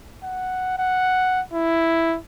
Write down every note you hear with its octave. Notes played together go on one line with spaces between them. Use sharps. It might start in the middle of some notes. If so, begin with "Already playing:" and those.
F#5
F#5
E4